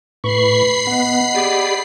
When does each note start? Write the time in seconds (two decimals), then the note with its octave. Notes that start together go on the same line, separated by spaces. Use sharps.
0.24 A2 B4 B5 C#6 C7
0.87 B3 D#5 F#5
1.35 G4 G#4 D5